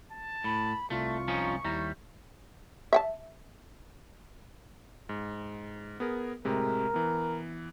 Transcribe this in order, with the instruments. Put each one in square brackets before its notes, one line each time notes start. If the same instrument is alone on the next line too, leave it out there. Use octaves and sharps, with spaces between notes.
[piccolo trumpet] A5
[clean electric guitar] A2 [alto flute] B5
[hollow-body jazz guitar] C2 [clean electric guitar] A3 [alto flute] F4 [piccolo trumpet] C#6
[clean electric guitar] F3 C#4 D#4
[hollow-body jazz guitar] D#2 E4 A#5 [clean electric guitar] G3
[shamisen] E5 G5 A5
[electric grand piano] G#2
B3 G#4 A#4
[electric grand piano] A2 C3 G#3 [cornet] A#4
[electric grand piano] E3 B3